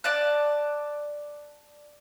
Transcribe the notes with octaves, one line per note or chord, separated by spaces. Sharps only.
D5 A5 F#6